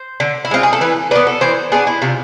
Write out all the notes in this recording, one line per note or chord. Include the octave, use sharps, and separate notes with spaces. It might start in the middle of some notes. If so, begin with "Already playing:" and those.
Already playing: C5
D3
E4
G#3 C4 F4
G#4
A4
E3 B4
B3 D4 B4
A4
E3 C5
B3 D4 G#4
E4
C3 F4